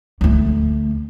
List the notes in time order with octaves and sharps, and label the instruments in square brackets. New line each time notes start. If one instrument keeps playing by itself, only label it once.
[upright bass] D2 A3